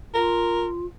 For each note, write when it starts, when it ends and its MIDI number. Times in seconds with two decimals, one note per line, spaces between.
0.14 0.86 65
0.14 0.66 70